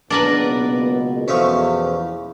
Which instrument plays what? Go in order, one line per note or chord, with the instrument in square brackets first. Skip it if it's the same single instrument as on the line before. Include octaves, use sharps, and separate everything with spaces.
[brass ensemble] F#1 C#2 B3 [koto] D4 A#4 B4
[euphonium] B2
[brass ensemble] E2 [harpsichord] F3 A3 C#4